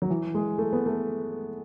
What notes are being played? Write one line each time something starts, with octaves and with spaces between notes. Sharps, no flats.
F#3
E3
G#3
A3
B3
A3